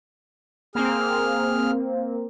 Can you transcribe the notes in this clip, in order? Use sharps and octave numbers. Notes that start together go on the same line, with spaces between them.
A#3 C4 G#4 F6